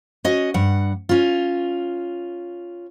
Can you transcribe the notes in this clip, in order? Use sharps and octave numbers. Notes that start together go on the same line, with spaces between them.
C#4 F#4 D#5
G2 F#5
C#4 F4